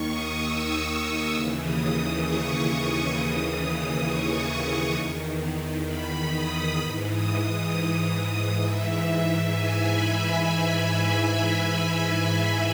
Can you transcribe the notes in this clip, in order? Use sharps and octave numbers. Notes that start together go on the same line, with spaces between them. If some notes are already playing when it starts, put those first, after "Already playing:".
Already playing: D#2 D#3 C#6
D#6
E6
D#6
D#2 C#3 E3 E6
D#6
C#6
D#2 C#3 E3 D#6
C#6
E2 D#3
B5
D#6
G#2 E3 B5
D#6
D#6
G#2 E3 E5
G#5
B5